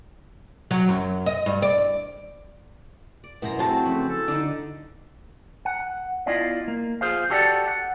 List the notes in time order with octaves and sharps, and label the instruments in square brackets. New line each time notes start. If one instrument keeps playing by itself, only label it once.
[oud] F#3
F#2
D#5
G2
D5
[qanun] D5
[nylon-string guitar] F#2 B2 B3 [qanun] E4 C5 A#5
[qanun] F#3 A3 [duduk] C4 [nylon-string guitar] E4 F#4 G#4 [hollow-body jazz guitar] C5 A5
[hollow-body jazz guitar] F2 C#3 A3 [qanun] B4
[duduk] A4
[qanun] D3 [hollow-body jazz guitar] D4 D#4
[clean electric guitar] F#5
B3 E4 F4 D5 D#5 F5
A#3
F4 G#4 C5 F5
F#4 G4 A4 D5 E5 F#5
F#5